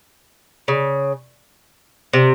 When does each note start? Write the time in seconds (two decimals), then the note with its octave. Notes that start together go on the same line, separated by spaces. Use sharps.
0.68 C#3
2.13 C3